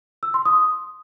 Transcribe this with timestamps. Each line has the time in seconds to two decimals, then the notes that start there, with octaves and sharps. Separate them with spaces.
0.23 E6
0.34 C6
0.45 D#6